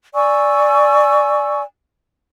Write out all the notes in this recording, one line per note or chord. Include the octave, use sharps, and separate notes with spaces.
D5 G#5 C#6 E6